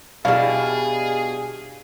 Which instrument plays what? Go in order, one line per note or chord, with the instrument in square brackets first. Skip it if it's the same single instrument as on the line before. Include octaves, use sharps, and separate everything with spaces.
[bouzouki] B2 G3 [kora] D4 E4 F4 [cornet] G#4 [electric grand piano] F5